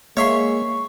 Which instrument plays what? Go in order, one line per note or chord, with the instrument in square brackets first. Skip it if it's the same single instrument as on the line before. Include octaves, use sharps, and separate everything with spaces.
[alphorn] G#3 [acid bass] A#3 [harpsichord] C#5 E5 C6 [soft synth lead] C#6